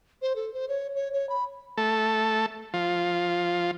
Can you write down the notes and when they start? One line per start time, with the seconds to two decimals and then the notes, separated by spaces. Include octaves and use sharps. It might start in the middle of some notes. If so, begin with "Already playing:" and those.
0.22 C5
0.36 A4
0.54 C5
0.69 C#5
0.95 C#5
1.13 C#5
1.29 B5
1.77 A3 A4
2.74 F3 F4